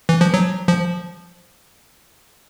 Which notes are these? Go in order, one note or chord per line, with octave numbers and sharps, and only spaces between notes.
E3
F3
F#3
F3